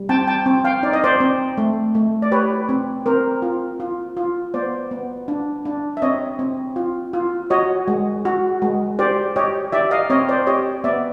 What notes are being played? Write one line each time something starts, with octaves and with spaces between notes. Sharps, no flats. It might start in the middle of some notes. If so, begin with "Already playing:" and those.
Already playing: G3
C4 G5 A5
G5 A5
C4
F5 G5
D#4 D5
D#5
C5 D5
C4
A3
A3
D5
G4 B4 C#5
C4
C4 A#4 C5
F4
F4
F4
B3 C5 D5
B3
D4
D4
E5
C4 C#5 D#5
C4
F4
F4
F#4 C#5 D#5
G#3
F#4
G#3
G4 C5 D5
G4 C#5 D#5
G4 D5 E5
D#5 F5
C4 C#5 D#5
C5 D5
G4 C#5 D#5
B3 D5 E5